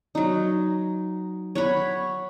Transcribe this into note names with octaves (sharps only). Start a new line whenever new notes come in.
F#3 D#4
C#5 F#5 B5